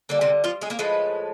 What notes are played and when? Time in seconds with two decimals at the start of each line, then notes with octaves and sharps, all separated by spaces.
0.09 D3 G3 A#3
0.21 C3 C4
0.44 F3 F4
0.62 G#3 G#4
0.70 A#3 A#4
0.79 A2 F3 G#3 B4